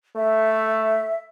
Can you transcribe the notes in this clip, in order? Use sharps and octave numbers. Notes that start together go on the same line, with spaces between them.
A3 E5